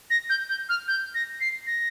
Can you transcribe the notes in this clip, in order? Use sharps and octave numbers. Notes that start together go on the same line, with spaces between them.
A#6
G6
G6
F6
G6
A#6
C7
A#6